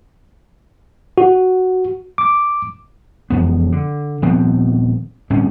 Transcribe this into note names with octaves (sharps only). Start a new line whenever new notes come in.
F#4
D6
E1 F2 B3
D3
D#1 F3 B3 C4
D1 G2 C4 C#4